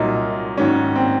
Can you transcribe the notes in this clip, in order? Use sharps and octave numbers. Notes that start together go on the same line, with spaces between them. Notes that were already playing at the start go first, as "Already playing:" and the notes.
Already playing: C2 A#2 F#3 D#4
G#2 D#3 F#3 C#4
C4